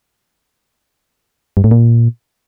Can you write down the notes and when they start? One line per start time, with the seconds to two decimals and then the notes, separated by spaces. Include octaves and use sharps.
1.57 G2
1.64 A2
1.71 A#2